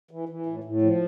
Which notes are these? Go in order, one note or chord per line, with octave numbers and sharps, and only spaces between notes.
E3
E3
A2
A2
F3